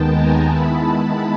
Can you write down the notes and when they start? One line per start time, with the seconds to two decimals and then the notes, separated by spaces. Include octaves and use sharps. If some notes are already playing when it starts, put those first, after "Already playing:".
Already playing: D#2 D#3 G#3 B3 G5 A5
0.13 G#5 A#5
0.47 D#3 G#3 B3 E4 A5 B5